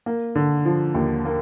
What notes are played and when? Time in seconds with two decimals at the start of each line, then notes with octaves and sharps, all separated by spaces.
0.06 A#3
0.35 D3
0.65 F3
0.94 D#2
1.25 A#3